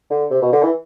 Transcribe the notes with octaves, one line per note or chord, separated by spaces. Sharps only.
D3
C3
B2
D3
E3